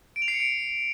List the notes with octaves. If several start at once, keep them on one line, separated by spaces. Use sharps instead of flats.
D7
F7
C7
C#7
D7